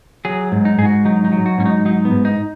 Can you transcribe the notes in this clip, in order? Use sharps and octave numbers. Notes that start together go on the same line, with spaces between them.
F#3 G#4
G#2
D#4
G#2 G#4
F#4
F#3 D#4
D#4
F#3
F#4
G#2 C#4
D#4
F#3 D#4
B3
G#2
D#4